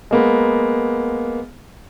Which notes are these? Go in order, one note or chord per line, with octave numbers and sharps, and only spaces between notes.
G#3 A#3 B3